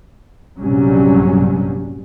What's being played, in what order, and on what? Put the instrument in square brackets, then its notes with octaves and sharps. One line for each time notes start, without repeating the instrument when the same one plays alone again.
[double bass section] A#1 G2 C3 F#3 G3 C#4